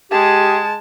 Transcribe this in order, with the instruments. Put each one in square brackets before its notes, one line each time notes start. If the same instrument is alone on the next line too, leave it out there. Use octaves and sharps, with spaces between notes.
[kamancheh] G#3 A5 [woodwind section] G4 G#4